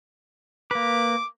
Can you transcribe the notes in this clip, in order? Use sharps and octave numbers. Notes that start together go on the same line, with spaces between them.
A#3 B4 D6